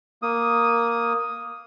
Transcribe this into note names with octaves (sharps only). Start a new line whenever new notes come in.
A#3 D#6